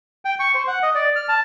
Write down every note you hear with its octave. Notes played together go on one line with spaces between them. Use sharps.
G5
C#6
C5
F#5
D#5
D5
F6
A5